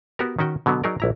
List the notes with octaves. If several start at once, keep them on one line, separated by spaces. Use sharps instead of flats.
B3 F#4 G4 A#4
D#3 C#4 F#4 G5
B2 D3 F#3 B3
F#3 D#4 G#4 A#4 D5
A#1 E4 A#5